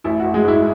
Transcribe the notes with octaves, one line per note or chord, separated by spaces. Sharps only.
A1 E4
A1 F#4
G#3 G#4
G#2 E4
E4